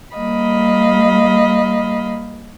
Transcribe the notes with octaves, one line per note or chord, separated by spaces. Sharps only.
G3 A#3 D#5 F5 B5